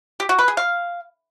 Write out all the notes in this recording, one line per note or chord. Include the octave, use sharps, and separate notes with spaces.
G4
F#4
B4
G#4
F5